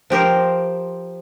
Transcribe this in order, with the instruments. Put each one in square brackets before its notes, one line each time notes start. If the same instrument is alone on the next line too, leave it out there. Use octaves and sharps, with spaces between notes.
[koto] F3 G4 A#4 C5